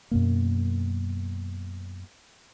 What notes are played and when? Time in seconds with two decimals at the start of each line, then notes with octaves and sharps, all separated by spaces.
0.11 F#2 B2 A#3